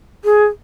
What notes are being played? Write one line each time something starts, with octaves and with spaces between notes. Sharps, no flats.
G#4